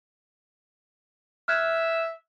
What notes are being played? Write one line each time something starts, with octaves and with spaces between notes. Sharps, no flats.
E5 F6 F#6 G#6